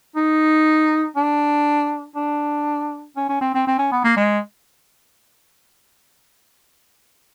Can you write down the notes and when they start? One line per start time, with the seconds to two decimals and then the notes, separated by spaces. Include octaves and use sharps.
0.16 D#4
1.16 D4
2.16 D4
3.17 C#4
3.29 C#4
3.41 C4
3.54 C4
3.67 C4
3.78 C#4
3.92 B3
4.04 A#3
4.17 G#3